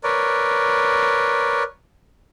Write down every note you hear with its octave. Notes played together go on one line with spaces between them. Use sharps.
A#4 B4 C#5 D5